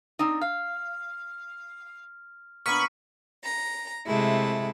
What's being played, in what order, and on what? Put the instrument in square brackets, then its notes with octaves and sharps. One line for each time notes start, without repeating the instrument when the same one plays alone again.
[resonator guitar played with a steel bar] C4 D4 D#4
[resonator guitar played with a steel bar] F5 [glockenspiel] F6
[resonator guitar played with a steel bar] A#2 B3 D4 [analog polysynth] B5 C#6 [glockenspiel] F6 B6 D#7
[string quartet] A#5
C3 G#3 A3 E4